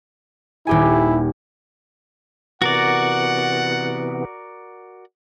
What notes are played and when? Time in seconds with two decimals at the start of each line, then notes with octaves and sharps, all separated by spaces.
0.67 D#1 E4 G4 G#5
2.62 C3 E3 B3 F#4 A#4 D5 F#5